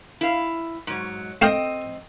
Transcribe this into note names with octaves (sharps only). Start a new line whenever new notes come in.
E4 F5
G#2 F#3
A3 C4 D#5 F5 G5